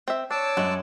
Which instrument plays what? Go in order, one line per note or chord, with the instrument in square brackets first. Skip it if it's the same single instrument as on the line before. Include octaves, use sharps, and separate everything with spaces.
[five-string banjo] C4 E5
[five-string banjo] D4 [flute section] C#5 [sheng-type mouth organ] A5 D6 E6
[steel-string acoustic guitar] F#2 [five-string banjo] G#3 F#4